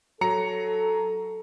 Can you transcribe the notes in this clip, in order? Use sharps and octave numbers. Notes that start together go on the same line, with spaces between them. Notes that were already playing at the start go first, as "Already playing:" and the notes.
F#3 A4 A#5 C#7